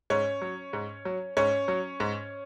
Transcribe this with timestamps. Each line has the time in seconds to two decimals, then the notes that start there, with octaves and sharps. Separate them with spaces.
0.10 G#2 C#4 C#5
0.42 F#3
0.73 G#2
1.05 F#3
1.37 G#2 C#4 C#5
1.68 F#3
2.00 G#2